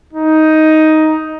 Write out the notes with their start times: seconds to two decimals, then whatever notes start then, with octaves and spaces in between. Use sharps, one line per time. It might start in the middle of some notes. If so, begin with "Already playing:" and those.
0.13 D#4